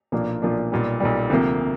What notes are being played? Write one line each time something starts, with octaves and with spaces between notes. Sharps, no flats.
B1 A#2 F3 A#3 D4
B1 A#2 F3 A#3 D4
B1 A#2 G3
B1 A#2 G3
D2 C3 F3 A#3
C3